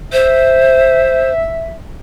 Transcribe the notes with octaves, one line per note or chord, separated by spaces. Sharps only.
C5 E5